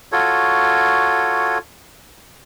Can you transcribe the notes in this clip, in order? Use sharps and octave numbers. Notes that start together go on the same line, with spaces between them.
F4 F#4 A4 C#5